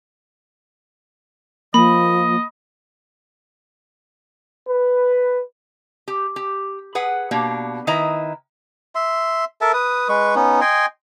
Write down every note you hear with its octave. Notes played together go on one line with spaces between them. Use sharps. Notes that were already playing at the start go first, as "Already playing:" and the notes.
F3 A#3 D#5 B5
B4
G4
G4
G#4 B4 F#5
B2 A#3 D4 G4
D#3 E4 B4 D#5 A#5
E5 C6
A4 A#4 E5 A5
B4 D#6
G#3 B4 C#6
B3 C#4 D#4
D#5 G5 G#5 C6